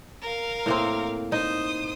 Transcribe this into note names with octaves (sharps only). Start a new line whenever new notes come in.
A#4 F5
A2 A#3 C4
D#4 C5 D#6